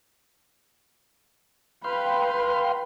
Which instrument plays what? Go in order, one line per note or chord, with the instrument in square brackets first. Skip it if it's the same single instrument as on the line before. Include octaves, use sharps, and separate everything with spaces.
[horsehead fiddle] B4 B5 [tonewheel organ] F5 G5 C6